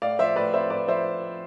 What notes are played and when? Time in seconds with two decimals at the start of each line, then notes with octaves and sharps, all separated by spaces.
0.02 A2 D5 F5
0.19 F3 C5 E5
0.36 A2 B4 D5
0.53 C4 C5 E5
0.70 A2 B4 D5
0.88 F3 C5 E5